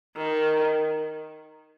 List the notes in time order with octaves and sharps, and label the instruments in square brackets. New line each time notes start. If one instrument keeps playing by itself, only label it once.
[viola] D#3